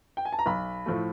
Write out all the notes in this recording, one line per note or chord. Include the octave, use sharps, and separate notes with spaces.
G5
G#5
A5
A#5
B1 B5
A2 F3 A3